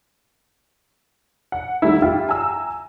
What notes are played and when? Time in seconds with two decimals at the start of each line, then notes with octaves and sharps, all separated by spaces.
1.52 F#5
1.82 D#3 G3 A3 E4
2.02 E4 F4 G4
2.29 G#5 A#5 E6